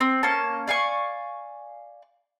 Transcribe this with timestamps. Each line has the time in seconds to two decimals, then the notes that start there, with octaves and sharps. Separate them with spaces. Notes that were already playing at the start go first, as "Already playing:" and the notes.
0.01 C4
0.23 A#3 C#4 A5
0.68 D5 F5 G#5 C#6